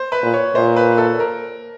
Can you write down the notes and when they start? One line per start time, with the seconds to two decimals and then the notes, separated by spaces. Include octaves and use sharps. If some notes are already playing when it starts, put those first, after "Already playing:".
Already playing: C5
0.12 B4
0.23 A#2
0.33 C#5
0.55 A#2 C5
0.76 B4
0.98 A4
1.19 A#4